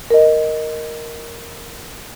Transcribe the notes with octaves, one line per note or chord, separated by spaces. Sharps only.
A#4 D#5